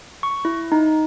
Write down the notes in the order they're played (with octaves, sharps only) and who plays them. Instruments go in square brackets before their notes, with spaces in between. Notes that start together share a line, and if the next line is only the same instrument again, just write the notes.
[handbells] C#6
E4
D#4